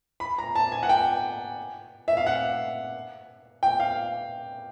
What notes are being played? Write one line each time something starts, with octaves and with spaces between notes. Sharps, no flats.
B5
A#5
A5
G#5
F#5
G5
E5
F5
F#5
G5
F5